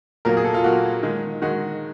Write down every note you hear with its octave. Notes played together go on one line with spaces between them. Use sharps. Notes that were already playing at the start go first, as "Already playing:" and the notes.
A#2 F#3 A#3 A#4
G#4
A4
F4
A#2 F#3 A#3 F#4
D#3 G#3
D#3 G#3 F#4